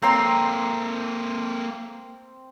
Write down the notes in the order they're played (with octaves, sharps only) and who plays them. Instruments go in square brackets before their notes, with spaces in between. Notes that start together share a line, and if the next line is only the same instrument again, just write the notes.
[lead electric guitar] A#3 A4 [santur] C4 A#5 C6